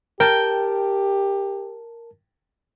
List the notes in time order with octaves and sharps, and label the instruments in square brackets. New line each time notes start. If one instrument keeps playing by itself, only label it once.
[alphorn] G4 [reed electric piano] A#4 A5 [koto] G5